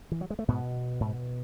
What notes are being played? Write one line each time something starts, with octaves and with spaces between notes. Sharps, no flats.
E3
F#3
G#3
A3
G#2 B2 B3
G#2